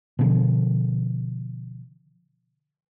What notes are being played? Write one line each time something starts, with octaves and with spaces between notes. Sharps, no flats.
B2 D3 F3